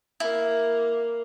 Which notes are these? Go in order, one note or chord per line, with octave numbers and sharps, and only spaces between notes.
A#3 E4